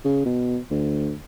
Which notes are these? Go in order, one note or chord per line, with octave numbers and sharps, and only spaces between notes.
C#3
B2
D2